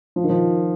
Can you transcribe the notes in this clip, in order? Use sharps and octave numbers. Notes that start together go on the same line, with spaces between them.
F3
D#3
F3